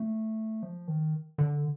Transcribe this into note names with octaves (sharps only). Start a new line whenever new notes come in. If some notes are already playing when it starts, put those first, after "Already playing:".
Already playing: A3
F3
D#3
D3